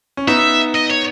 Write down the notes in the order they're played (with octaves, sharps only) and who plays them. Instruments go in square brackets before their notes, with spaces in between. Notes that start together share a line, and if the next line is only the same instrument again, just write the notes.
[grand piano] C#4
[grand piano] B3 D#4 [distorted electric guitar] E5
[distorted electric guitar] D#5
C#5